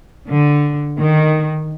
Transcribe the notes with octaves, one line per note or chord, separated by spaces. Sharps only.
D3
D#3